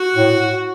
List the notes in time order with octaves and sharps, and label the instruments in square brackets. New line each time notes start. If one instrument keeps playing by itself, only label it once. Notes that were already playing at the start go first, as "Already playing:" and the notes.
Already playing: [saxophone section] F#4
[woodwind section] A2